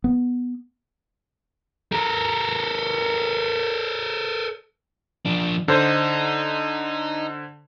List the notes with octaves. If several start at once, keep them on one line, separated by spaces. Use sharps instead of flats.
B3
A4 A#4
F3 D4
D3 D#4 C5